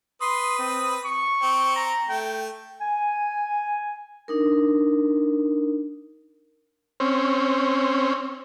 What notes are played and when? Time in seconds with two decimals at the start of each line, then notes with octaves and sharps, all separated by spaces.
0.22 B4 C6 D#6
0.59 C4
1.04 C#6
1.42 C4
1.76 A#5
2.09 A3 G5
2.81 G#5
4.28 D4 D#4 A#4
7.00 C4 C#4